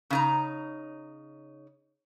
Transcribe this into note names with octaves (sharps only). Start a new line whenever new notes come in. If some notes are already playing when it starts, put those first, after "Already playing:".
C#3 D#4 A#5